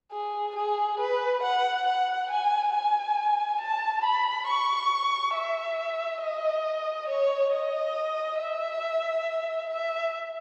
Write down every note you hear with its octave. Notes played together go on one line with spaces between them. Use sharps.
G#4
G#4
B4
F#5
F#5
G#5
G#5
A5
B5
C#6
E5
D#5
C#5
D#5
E5
E5